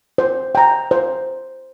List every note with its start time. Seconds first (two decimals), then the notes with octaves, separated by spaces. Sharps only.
0.18 C5
0.55 G5 A#5
0.91 C5